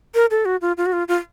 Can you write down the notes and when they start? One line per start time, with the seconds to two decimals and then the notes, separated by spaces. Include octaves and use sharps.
0.15 A#4
0.31 A4
0.45 F#4
0.61 F4
0.77 F4
0.86 F#4
0.93 F4
1.08 F4